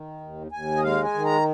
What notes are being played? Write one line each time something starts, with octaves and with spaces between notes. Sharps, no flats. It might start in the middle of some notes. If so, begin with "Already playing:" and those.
Already playing: D#3
D#2
D#2 G#5
D#5
G#3 F5
G#5
D#3
A#5